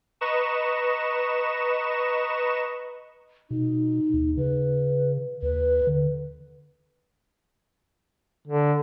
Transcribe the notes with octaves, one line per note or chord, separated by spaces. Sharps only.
B4 D#5 A#5 C#6 E7
B2 D#4
D#2
C#3 B4
D#2 B4
D3
D3